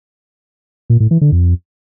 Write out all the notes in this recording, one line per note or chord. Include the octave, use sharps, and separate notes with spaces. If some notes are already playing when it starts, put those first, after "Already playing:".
A#2
A2
E3
D3
F2